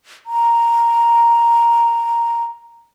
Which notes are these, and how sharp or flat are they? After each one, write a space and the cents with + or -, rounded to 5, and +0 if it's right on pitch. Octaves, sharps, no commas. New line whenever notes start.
A#5 +0